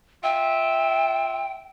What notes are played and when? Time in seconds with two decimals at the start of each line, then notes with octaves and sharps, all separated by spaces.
0.23 F4 E5 G5